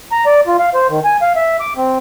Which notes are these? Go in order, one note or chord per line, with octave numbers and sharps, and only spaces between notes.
A#5
D5
F4
F5
C5
D#3
G#5
F5
E5
D6
C4